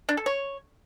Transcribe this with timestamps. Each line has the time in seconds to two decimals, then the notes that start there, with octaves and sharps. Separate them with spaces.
0.09 D4
0.17 A4
0.26 C#5